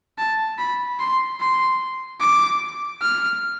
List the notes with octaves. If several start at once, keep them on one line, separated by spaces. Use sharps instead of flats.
A5
B5
C6
C6
D6
F6